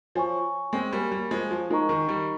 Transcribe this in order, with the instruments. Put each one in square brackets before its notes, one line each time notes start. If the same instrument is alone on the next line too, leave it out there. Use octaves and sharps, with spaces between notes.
[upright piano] F3 [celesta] C#5 G#5 C#6
[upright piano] G#3 C4
G3 A#3
G3 A#3
F3 G#3
F3
[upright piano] F3 G#3 [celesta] D#4 A#4 D#5 A#5 C#6
[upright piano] D#3
D#3 G3